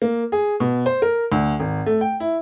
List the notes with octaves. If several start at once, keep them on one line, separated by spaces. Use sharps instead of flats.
A#3
G#4
B2
C5
A#4
D2
G#1
A3
G5
E4